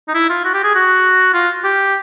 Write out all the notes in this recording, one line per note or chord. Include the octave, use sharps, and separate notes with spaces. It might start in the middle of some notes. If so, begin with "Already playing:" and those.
D#4
E4
F4
F#4
G4
G#4
F#4
F4
G4